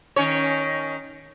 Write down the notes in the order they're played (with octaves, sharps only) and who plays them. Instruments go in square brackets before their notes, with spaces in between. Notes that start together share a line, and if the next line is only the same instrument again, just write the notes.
[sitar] D#3 C#4 C#5